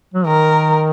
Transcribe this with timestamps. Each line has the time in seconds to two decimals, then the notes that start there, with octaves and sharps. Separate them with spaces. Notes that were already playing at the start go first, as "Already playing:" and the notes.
0.14 F#3
0.26 D#3 A#4